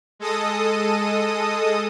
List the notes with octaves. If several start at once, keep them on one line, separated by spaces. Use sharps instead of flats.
G#3 A4 D#5 D#6